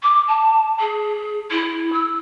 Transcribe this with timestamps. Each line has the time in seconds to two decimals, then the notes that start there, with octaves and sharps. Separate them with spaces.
0.03 D6
0.28 A5
0.80 G#4
1.51 E4
1.93 E6